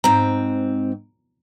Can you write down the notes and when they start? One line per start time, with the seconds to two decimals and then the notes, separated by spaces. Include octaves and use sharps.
0.04 G#2 C4 A#5